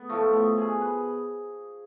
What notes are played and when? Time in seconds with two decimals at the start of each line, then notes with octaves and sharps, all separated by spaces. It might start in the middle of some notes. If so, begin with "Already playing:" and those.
Already playing: B3
0.09 A2 F3 A3
0.33 B3
0.57 B2 G#4
0.81 B4